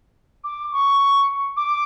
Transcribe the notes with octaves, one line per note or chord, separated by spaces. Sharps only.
D6
C#6
D6